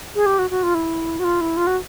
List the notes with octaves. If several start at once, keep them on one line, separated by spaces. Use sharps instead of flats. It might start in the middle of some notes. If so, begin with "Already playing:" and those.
G#4
G4
F#4
F#4
F4
E4
F#4
F4
E4
F4
F#4